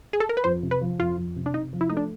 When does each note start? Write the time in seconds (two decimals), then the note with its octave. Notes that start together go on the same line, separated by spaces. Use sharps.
0.13 G#4
0.20 A4
0.29 A#4
0.37 B4
0.44 F2 C5
0.63 C3
0.71 B4
0.81 F3
0.99 F2 F4
1.18 F2
1.36 C3
1.46 D4
1.54 C3 D#4
1.73 F3
1.81 E4
1.90 A3 D#4
1.97 D4